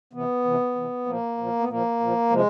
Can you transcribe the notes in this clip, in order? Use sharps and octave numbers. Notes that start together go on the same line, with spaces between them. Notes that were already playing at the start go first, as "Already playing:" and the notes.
C3 E3 B3
C3 E3
C3 E3
A#2 F3 A#3
A#2 F3
B3
A#2 F3 A#3
A#2 F3
C3 F3 G#3